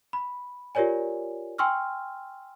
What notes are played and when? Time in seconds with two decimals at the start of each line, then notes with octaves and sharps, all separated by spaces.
0.13 B5
0.75 F4 G4 A#4 C#5 D5 G#5
1.58 G5 G#5 C6 C#6 E6 F6